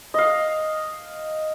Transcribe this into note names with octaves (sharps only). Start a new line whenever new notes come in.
D#5 F5